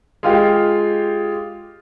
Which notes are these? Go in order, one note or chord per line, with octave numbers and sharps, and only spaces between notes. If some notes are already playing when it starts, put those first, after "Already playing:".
G#3 F4 G4